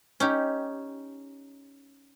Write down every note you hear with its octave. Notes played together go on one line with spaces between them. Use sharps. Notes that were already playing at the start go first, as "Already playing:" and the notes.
C#4 D#4 G4